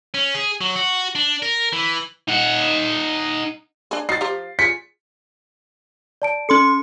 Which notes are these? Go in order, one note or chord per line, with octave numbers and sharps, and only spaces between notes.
C#4
G#4
F#3
F#4
D4
A#4
E3
D#4 F#5
D4 G#4
D#4 F#4 A6 C7
F3 G4 A#5
F4 G#4 B6 C#7
D5 A5 D7
C#4 A4 C6 C#7